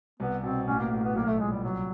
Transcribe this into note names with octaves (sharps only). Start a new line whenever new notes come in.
C2 B3
B2 C4
A1 C#4
A#3
A2 A#3
B3
B1 A#3
A3
A#2 G#3
G3
C2 F#3